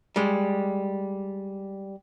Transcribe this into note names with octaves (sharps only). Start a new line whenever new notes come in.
G3 G#3